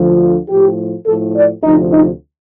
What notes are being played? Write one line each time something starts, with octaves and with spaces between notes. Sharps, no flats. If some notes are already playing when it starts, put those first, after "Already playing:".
Already playing: D2 D3 F3
A2 F3 G4
A2 F3 A4
D5
D2 C3 F3 D#4
D#4